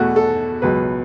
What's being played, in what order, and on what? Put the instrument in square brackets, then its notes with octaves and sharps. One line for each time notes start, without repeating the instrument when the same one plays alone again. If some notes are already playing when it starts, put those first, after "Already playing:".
Already playing: [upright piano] E2 B2 A3 F#4
A4
C#2 B2 F#3 B4